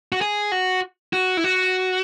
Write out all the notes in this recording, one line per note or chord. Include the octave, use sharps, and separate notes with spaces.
F#4
G#4
F#4
F#4
E4
F#4